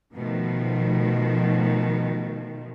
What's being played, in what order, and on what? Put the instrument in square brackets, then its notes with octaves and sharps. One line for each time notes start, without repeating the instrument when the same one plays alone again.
[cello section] B2 D#3 F3 A3